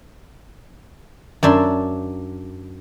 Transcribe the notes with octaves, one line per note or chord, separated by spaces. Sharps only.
F#2 D4 E5 C6